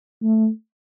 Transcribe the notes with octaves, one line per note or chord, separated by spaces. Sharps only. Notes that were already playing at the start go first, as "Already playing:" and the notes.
A3